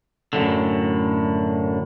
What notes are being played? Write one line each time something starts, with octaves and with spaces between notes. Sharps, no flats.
F#2 A2 D3